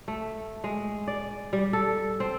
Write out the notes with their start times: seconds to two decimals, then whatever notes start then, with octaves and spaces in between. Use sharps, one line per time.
0.08 A3
0.64 G#3
1.08 D5
1.53 G3
1.73 A4
2.20 C4